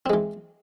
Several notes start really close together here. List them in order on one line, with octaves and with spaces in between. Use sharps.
C4 G#3 E3